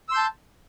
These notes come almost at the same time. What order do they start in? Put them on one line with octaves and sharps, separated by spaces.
E6 C6 G6 A5